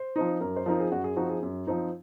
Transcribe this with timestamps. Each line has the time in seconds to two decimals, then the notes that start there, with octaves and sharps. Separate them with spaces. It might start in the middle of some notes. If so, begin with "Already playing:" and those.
Already playing: C5
0.16 F3 C4 D#4
0.41 F#2 A#4
0.56 C5
0.66 F3 C4 D#4 A#4
0.80 G#4
0.92 F#2 F#4
1.04 G#4
1.16 F3 C4 D#4 F#4
1.29 G#4
1.42 F#2
1.67 F3 C4 D#4